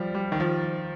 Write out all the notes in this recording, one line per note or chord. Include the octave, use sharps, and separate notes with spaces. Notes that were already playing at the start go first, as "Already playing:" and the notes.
Already playing: F3 G3
G3
D#3
F3